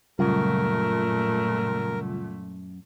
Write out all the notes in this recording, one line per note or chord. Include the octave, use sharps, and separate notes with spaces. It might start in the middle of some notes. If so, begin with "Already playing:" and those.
F#2 A#2 C#3 G3 A3 F4 A#4